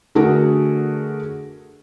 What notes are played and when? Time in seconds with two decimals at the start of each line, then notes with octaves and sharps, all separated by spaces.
0.15 D3 A3 F#4 G#4 A#4